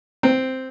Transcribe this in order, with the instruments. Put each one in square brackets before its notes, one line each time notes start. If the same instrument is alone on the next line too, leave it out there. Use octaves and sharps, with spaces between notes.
[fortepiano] C4